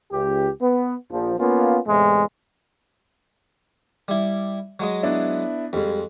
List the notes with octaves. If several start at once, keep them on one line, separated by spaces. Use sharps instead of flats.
C#2 G4
B3
A#1 F3
A#3 B3 C#4 F4
E2 A2 C3 G#3
G3 E4
F#3 G#3 D#5
B3 D4 E4
F2 G3 G#3